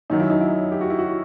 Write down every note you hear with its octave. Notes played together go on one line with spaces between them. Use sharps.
F#2 D#3 F#3 D#4
E4
D#4
E4
G4
F#4
E4
F#4